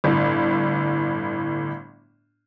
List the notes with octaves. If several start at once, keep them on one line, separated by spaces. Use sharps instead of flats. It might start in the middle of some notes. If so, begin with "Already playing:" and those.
G1 A2